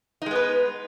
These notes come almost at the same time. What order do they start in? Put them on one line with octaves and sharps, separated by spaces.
D#4 G#3 B3 B4